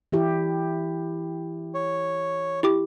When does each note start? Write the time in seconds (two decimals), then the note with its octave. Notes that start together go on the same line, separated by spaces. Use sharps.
0.12 E3 E4 G4
1.74 C#5
2.63 E4 G4 D6